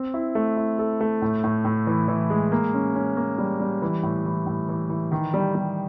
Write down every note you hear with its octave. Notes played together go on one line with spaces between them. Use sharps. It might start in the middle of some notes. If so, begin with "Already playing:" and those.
Already playing: C4
E4
A3
E4
A4
A3
A2
A2
A2
E3
E3
G#3
A#3
C#4
C#4
A#3
G3
G3
E3
A2
E3
A2
E3
E3
D#3
G3
G3